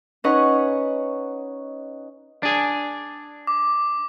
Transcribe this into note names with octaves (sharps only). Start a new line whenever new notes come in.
C#4 D#4 B4 D#5 F#5 C#6
D4 G#4
D6